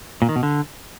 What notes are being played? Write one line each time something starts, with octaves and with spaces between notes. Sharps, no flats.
A#2
D#3
B2
D3